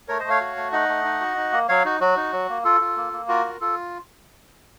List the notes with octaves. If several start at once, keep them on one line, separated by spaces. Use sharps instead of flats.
A3 A#4 C#5
C5 D#5
A3
C#5 F5
F#4
A3
D#4 D#5 F#5
A3
D#4
F#4
D#4
A#3
F#3 C#5 F5
D#4 F#4
F#3 F#4
D#4
F#3
A#3
F4 A4
F4
A#3
A#3
F4 F#4 A#4
F4
F4 A4